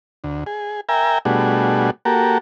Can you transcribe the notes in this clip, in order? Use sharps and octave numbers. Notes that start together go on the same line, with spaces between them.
D2
G#4
A#4 E5 G5 G#5 A#5
B2 G3 A3 D4 F#4 G#4
A#3 F#4 G4 A4 A#4